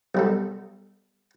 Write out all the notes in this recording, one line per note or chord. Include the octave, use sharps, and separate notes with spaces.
B1 G3 A4